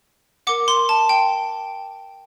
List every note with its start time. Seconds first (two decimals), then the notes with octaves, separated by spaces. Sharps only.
0.47 A#4 F#5 D6
0.68 C6
0.89 A5
1.09 G5